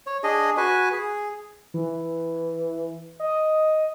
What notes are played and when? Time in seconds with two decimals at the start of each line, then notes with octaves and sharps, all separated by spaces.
0.07 C#5
0.24 D4 G#4 D#5
0.57 F#4 B4 G#5
0.92 G#4
1.74 E3
3.20 D#5